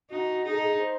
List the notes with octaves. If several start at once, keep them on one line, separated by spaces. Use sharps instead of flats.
D#4 F#4
D#4 G#4
A4
G#4
C5